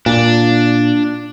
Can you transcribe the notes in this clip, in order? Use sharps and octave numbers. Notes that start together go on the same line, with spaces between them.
A#2 D4